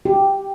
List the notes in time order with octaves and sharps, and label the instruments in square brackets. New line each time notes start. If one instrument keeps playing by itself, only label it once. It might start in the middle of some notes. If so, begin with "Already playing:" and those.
[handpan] G4